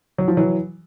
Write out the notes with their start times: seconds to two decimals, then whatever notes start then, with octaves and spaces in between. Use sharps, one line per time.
0.18 F#3
0.28 F3
0.37 E3 F#3